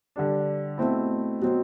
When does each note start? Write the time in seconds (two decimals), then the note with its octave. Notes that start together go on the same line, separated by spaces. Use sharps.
0.16 D3 G3 D4
0.78 B2 A3 C4 E4
1.42 B2 F#3 C4